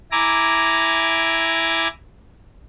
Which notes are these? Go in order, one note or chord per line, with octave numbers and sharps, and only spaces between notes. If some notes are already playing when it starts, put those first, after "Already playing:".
E4 G#5 A#5 D6